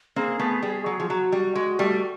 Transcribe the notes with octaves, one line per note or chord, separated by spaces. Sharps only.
A#3 C4 G#4
A3 B3
G3
F#3
F3
F#3 F#4
G3
G#3
G3 A3